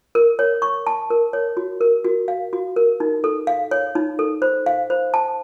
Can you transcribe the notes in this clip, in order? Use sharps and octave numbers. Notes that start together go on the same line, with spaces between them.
A#4
C#5
C#6
A5
A#4
C#5
F#4
A#4
F#4
F5
F#4
A#4
D#4
A4
F5
C#5
D#4
A4
C5
F5
C5
A5